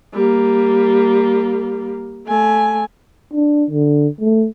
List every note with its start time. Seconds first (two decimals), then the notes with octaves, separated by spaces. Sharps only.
0.14 G3 A#3
2.27 A3 G#5
3.33 D4
3.71 D3
4.21 A3